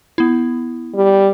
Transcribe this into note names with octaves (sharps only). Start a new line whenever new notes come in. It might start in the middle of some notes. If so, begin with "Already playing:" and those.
B3 E4
G3